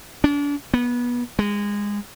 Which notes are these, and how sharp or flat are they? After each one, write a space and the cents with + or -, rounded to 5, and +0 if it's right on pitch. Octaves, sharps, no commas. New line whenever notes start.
D4 -35
B3 -25
G#3 -20